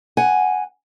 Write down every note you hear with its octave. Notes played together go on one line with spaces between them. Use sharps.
F#5 G#5